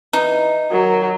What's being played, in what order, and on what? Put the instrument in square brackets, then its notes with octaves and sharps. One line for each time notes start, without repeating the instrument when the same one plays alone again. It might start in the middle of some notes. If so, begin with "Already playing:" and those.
[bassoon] E3 [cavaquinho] D#4
[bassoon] D#3 [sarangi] F#3